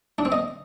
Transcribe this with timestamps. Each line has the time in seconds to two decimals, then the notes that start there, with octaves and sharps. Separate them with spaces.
0.18 D4
0.25 C4
0.32 D#5